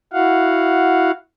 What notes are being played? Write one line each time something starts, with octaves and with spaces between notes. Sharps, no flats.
E4 F#4 F5 F#5